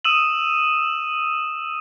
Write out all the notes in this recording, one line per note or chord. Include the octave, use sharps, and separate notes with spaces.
D#6 E6 D#7 E7 F#7